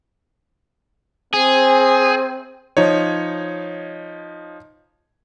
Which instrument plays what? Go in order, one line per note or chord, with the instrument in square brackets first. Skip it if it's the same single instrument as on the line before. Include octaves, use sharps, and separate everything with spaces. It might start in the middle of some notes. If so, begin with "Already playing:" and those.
[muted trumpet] C4 [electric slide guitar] G#4
[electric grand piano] F3 D#4 C#5